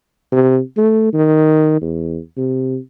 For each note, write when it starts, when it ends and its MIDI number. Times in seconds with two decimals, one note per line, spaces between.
0.32 0.60 48
0.77 1.11 57
1.13 1.81 51
1.82 2.18 40
2.37 2.78 48